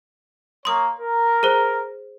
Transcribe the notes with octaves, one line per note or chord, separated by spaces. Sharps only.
A#3 C#5 C6 D#6
A#4
G#4 C5